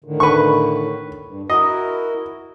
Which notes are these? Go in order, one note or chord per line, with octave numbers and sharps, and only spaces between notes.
A2 D3 D#3
B4 C#6
G2
E4 F#4 A#4 D#5